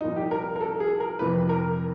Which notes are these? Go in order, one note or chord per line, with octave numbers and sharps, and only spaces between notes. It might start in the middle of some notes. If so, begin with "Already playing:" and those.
C2 A#2 F3 D#4
G4
A#4
A#4
A4
G#4
A#4
F2 C3 E3 B4
A#4